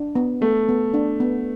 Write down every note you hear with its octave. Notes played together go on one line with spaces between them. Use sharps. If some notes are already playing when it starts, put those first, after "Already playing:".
Already playing: D4
B3
A3 B3
B3
D4
B3